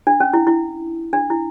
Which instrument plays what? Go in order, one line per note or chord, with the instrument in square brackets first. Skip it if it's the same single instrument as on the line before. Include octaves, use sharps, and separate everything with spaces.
[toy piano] D4
C#4
E4
E4
D4
E4